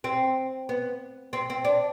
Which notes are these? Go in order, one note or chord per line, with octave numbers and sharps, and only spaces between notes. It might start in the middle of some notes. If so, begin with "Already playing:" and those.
C4
B3
C4
C4
D4